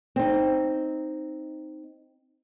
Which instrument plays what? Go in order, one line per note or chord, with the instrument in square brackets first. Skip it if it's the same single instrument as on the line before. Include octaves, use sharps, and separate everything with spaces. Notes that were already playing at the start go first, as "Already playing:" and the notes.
[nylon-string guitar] C4 D#4